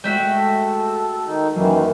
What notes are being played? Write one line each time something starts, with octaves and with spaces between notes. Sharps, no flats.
G#3 A3 F#4 E5 G5
A4
D#3 D#4
F#2 D#3 E3 F#3 A#3 C#4